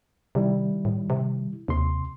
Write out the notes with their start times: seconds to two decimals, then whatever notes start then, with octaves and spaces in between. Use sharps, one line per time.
0.35 C3 D#3 G3 E4
0.85 A2
1.10 C3
1.68 D#2 C3 C6